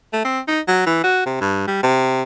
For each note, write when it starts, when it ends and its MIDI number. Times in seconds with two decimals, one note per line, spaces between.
0.13 0.23 57
0.25 0.40 60
0.48 0.61 63
0.68 0.82 54
0.86 1.03 52
1.04 1.22 66
1.26 1.39 48
1.41 1.66 43
1.68 1.79 55
1.83 2.23 48